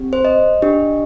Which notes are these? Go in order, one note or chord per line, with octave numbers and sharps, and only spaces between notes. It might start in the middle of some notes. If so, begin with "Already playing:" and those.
Already playing: C4 G4
C5
D#5
D4 G4